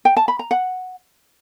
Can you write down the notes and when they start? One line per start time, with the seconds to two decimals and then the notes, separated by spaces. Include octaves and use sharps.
0.05 G5
0.17 A5
0.28 B5
0.39 A#5
0.51 F#5